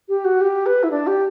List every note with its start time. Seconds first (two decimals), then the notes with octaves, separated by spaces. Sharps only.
0.08 G4
0.24 F#4
0.41 G4
0.65 B4
0.83 E4
0.90 D4
1.06 G4